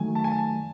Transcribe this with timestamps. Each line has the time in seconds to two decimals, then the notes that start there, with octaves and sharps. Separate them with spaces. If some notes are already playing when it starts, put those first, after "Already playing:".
Already playing: D#3 F#3 A3 G#5
0.15 A5
0.24 G#5
0.32 A5